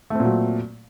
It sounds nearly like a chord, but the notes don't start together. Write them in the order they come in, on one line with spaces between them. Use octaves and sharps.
A3 C4 A#2 F#3